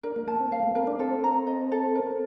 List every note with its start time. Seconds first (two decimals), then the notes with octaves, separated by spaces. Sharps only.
0.03 D4 A#4
0.16 A#3
0.27 A#3 A5
0.40 C4
0.52 A#3 F5
0.63 A3
0.75 C4 A#4
0.87 D4
0.99 C4 A4
1.24 A#5
1.47 D#5
1.72 A4
1.95 A#4